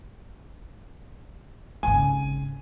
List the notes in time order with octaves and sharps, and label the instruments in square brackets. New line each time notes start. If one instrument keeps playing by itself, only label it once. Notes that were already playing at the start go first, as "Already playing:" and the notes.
[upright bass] G#1 C#3 [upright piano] G#5